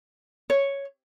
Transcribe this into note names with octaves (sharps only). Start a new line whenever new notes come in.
C#5